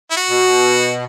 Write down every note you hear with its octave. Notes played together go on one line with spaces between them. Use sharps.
E4
F#4
B2